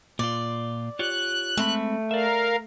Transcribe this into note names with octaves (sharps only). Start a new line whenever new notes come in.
A#2 F4 D5
F4 G4 C#5 F#6
G#3 A3 C4 B5
A#4 D5 E5 F5